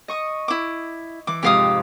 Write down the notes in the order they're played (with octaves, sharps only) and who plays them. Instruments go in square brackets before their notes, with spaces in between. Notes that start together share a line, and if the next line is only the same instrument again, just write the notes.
[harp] D#5 C#6 D#6
[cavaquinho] E4 D6
[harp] E3 [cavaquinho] D6
[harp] F2 G#2 C3 [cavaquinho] G4 F5 D#6